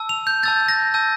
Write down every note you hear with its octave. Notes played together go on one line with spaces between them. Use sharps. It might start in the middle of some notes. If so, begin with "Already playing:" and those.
Already playing: A5 E6
F7
G6
A5 E6 G6 A6
A#6
A5 E6 G6